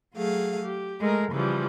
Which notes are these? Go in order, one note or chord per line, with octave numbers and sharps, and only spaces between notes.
F#3 A3 G#4 F5
G4
G#3 A3 A#4
C#3 E3 F3 G3